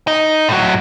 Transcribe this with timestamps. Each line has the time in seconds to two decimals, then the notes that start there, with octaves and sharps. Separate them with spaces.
0.07 D#4
0.49 A2 F#3